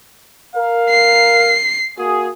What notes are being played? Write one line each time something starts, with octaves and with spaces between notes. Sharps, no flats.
A#4 F5
C7
A#3 F#4 G#4